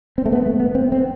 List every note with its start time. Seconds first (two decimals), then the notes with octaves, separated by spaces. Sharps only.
0.18 C4
0.26 A3
0.32 B3
0.46 A3
0.60 B3
0.75 C4
0.92 C4